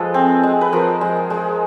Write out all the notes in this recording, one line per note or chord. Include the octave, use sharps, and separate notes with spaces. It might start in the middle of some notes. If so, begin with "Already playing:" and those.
Already playing: F3 G#3 A4 B4
C4
G#3
B4
F3 A#4 C5
G#3
G#3